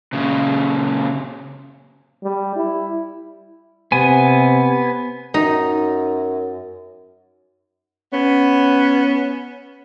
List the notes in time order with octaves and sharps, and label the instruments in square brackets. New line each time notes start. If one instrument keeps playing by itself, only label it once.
[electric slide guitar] A#2 C#3
[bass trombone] G3
E4
[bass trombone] C3 [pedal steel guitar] B3 G#5
[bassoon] F#2 [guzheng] D#4
[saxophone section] B3 C#4